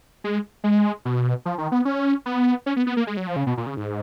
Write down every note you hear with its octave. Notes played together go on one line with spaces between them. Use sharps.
G#3
G#3
B2
F3
D#3
B3
C#4
B3
C#4
B3
B3
A#3
G#3
F#3
F3
C#3
B2
A#2
C#3
G#2